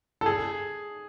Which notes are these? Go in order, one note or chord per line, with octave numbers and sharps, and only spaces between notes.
A4
G#4